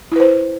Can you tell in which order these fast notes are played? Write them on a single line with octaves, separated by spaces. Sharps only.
E4 B4 C5